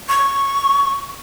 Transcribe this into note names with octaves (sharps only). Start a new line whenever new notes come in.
C#6